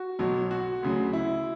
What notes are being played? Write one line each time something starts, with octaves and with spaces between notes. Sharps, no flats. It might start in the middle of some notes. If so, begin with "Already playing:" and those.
Already playing: F#4
B1 B2 F#3
F#4
D2 C#3 F#3
E4